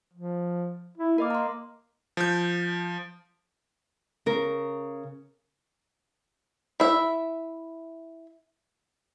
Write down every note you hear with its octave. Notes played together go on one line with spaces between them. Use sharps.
F3
E4
A#3 A#4 D#5 D6
A#5 C6
F3 G6
C#3 A#4
E4 E5